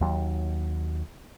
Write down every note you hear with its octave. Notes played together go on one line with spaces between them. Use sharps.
D#2 F#3